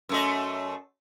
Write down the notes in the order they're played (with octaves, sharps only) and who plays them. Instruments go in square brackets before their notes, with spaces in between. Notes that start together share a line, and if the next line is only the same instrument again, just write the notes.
[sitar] F#2 A3 D#5